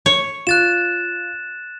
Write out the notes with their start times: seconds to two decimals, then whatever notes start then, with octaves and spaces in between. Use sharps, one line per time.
0.06 C#5
0.47 F4 F#6 A6 E7